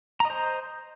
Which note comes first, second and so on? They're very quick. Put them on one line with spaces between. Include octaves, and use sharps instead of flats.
A#5 D#5 C5